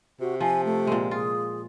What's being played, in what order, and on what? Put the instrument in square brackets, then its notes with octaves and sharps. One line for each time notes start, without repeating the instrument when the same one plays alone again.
[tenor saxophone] C3 [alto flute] F#4
[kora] F3 [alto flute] G#5
[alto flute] A3
[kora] A#2 G#3
[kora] F4 [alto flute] G#4